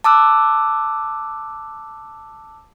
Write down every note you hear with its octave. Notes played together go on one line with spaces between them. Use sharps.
A5 D6 E6 F#6